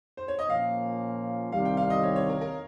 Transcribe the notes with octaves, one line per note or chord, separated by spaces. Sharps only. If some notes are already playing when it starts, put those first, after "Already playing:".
C5
C#5
D#5
A#2 F3 A#3 C#4 F5
C2 C3 D#3 G3 F5
G5
F5
D#5
C#5
C#5
A#4
A#4